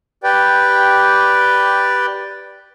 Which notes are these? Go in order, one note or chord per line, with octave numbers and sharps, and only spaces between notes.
G4 B4 D5 G5